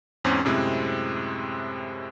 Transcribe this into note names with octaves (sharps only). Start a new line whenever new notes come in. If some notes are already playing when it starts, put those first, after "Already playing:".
E2 G#2 C4 C#4
F#2 A2 C3 G#3 C4 E4